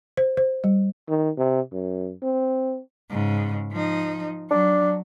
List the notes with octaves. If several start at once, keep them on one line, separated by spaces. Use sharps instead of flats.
C5
C5
G3
D#3
C3
F#2
C4
G#2 C#3
F3 D#4
F#3 D4